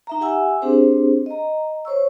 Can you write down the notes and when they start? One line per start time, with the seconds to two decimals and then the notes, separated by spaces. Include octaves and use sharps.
0.07 D#4 E5 A#5
0.21 G4 E5 F#5 G#5 E6
0.62 C4 D4 G4 G#4 C5
1.26 D#5 A#5
1.85 C5 C#5 C#6 E6